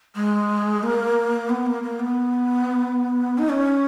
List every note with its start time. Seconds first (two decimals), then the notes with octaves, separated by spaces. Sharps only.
0.16 G#3
0.83 A#3
1.49 B3
1.66 A#3
1.83 A#3
2.00 B3
3.38 D#4
3.49 C#4